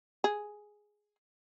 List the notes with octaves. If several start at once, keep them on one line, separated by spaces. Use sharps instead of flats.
G#4